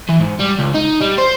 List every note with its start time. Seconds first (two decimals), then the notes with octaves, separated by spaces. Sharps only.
0.09 E3
0.21 G#2
0.40 G3
0.59 C#2
0.74 D#4
1.01 G3
1.18 C5